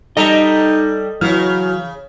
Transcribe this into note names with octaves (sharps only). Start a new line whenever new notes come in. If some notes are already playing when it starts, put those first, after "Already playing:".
G3 D#4 A4 D#5 A#5
C#3 E3 F#3 F6